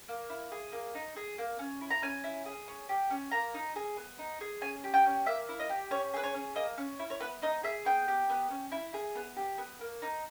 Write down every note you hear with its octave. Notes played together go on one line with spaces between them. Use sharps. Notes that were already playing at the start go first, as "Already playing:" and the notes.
A#3
E4
G#4
A#3
D#4
G#4
A#3
C#4
E4
A#5
C#4 G#5
E4
G#4
C#4
G4
C#4
A#3 A#5
D#4
G#4
B3
D#4
G#4
C#4 G#5
G4
G5
C#4
A#3 E5
E4
D#5
G4
C#4 C#5
G#4 B4
C#5
C#4
A#3 D#5
C#4
E4
C#5
B3 B4
D#4 D#5
G#4 E5
B3 G5
G4
B3
C#4
E4
G#4
B3
G4
B3
A#3
D#4